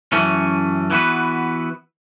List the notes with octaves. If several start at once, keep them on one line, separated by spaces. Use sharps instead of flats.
F#2 E3 A3 C#4
E3 B3 F#4 B4